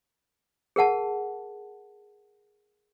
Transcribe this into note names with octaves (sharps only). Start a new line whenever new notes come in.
G#4 A#4 F#5 A5